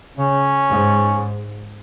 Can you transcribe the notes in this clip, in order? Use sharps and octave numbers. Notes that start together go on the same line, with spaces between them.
C#3 C#4
G#2